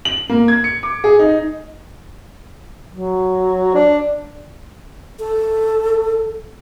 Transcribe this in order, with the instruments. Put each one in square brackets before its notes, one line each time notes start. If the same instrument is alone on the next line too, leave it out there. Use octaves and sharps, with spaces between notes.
[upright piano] F#7
A#3
G#6
C#7
D6
G#4
D#4
[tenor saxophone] F#3
D4
[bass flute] A4